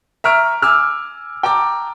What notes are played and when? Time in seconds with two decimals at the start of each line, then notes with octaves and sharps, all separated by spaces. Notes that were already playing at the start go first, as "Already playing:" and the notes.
0.24 E5 A#5 C#6 F6 D7
0.62 G#5 D6 E6 F6
1.43 G5 A5 A#5 D6